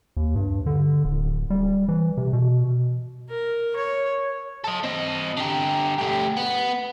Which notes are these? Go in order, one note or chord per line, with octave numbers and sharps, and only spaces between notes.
D#2
G2
D3
D1
G3
E3
C3
B2
A#4
C#5
A4 D#5
C4 D#5
D3 G4
A3 G4
B3